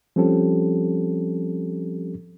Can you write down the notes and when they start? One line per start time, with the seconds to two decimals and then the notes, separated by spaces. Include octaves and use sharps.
0.16 F3 G3 C4 C#4 G4 A4